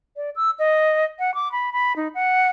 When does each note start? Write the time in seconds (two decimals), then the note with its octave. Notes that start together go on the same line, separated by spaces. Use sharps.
0.16 D5
0.36 E6
0.59 D#5
1.19 F#5
1.35 D6
1.52 B5
1.73 B5
1.96 D#4
2.15 F#5